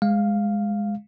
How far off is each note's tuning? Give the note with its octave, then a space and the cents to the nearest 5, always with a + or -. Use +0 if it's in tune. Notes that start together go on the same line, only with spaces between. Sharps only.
G#3 -5 F5 +0